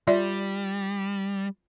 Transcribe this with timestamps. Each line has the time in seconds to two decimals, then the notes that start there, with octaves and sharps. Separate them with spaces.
0.07 G3 F4 D5 E5